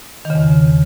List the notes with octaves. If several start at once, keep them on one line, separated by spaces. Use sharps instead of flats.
D#3
C#3
E2